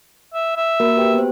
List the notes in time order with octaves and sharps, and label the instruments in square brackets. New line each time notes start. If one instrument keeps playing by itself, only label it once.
[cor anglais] E5
E5
[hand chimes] A#3 F#4 A#4
G4 B4 G5
B3 F#4 C5